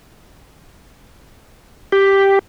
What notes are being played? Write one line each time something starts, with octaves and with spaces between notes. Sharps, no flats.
G4